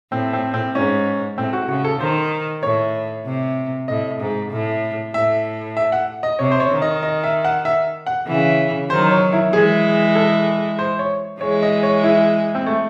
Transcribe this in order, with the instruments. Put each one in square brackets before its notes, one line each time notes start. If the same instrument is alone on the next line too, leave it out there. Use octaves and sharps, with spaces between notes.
[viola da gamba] A2 [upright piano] C4
[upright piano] C4
C4
[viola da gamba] G#2 [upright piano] C#4
[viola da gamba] A2 [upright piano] C4
[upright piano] F#4
[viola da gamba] C#3 [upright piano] F#4
[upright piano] A4
[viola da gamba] D#3 [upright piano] C5
[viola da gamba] A2 [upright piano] C#5
[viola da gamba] C3
[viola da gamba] A2 [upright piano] D#5
[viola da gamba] G#2
A2
[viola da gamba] A2 [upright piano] E5
[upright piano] E5
F#5
D#5
[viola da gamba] C3 [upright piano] C#5
[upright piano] C5
C#5
[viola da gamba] D#3
[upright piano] D#5
D#5
E5
F#5
E5
F#5
[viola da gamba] C#3 E3
[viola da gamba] D#3 F#3 [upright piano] C5
[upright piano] C#5
E4
[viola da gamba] E3 G#3 [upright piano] G#4
[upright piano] A4
C5
C#5
[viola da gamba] E3 G#3 [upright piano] C#5
[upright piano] D#5
C#5
E4
C4
A3